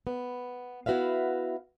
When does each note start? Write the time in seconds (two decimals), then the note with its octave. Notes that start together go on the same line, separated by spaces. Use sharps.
0.07 B3
0.86 B3 E4 F#4 B4 E5 F5